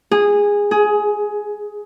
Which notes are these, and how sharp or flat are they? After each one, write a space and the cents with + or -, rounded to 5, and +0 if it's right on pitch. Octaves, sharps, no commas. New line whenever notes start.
G#4 -15
G#4 +15